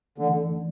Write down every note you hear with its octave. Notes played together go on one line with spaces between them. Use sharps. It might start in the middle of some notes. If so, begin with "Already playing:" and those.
D3 E3 A3 C#4